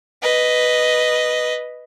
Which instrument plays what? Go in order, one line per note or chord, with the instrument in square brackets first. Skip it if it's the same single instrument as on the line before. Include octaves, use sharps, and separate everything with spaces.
[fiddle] B4 D#5